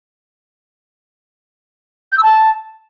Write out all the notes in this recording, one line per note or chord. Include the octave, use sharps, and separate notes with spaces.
G6
E6
A5